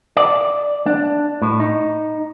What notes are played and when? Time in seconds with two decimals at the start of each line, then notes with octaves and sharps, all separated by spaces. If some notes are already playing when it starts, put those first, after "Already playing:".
0.17 D5
0.86 D4
1.42 A2
1.60 D#4